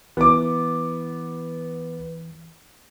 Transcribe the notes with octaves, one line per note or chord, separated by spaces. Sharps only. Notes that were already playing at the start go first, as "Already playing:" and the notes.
E3 B3 D6